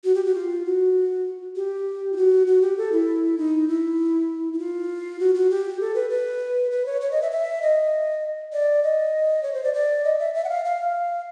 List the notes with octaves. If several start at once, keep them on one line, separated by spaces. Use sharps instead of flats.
F#4
G4
F#4
F4
F#4
G4
F4
F#4
F#4
G4
A4
E4
D#4
E4
E4
F4
F#4
F#4
G4
A4
B4
B4
B4
C#5
C#5
D#5
E5
E5
D#5
D5
D#5
C#5
C5
D5
D5
D#5
E5
E5
F#5
F5
F5